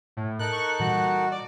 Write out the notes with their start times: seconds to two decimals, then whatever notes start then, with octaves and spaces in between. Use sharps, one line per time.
0.17 A2
0.39 D#4 A4 A#4 F#6
0.52 C#6
0.80 A#2 E3 G3 F#4
1.32 D5